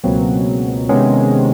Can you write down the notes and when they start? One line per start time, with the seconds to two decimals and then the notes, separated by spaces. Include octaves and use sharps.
0.04 C#2 B2 F#3 A#3 C4
0.89 C3 D#3 G#3 B3 C#4